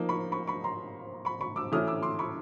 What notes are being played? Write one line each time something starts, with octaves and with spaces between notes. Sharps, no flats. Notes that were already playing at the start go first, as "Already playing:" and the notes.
Already playing: F3 A#3 D#4
B5 C#6
B5 C#6
B5 C#6
A#5 C6
B5 C#6
B5 C#6
D6 E6
E3 A3 C#4 E4 D#6 F6
D6 E6
C6 D6
B5 C#6